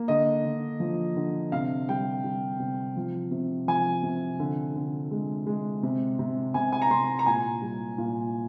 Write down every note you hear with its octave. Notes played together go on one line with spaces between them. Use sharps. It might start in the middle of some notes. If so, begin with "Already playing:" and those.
Already playing: A#3
D3 D#5
D3
F3
D3
C3 F5
G3 G5
G3
C3
F3
C3
F3 G#5
C3
D3
D3
G#3
G#3
C3
C3
C3 G#5
G#5
A#5
C3 C6
A#5
A#2 G#5
G3
A#2